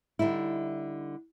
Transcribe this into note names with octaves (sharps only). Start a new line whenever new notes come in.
D3 G3 D#4 E4